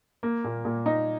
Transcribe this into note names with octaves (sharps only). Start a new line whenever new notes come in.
A#3
A#2
A#2
D#4